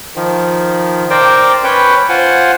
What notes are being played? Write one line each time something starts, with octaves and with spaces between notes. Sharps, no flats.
D#3 F3
A#4 C5 D5 G5
C#4 B4 C#5 G5
F4 C5 F#5 G#5